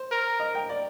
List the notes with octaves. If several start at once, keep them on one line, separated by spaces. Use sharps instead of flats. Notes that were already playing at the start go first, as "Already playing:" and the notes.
Already playing: C5
A#4
D#5
G5
D5